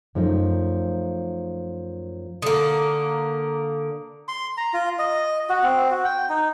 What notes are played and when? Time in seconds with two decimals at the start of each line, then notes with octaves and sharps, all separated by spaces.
0.15 F#2 F3 A3 D#4
2.42 D3 A#3 A4 D#6
4.28 C6
4.57 A#5
4.74 F4
4.99 D#5
5.49 F#4
5.63 C4
5.91 F#4
6.04 G5
6.29 D#4